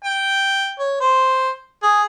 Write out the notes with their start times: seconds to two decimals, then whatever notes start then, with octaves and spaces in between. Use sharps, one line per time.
0.04 G5
0.79 C#5
1.00 C5
1.83 G#4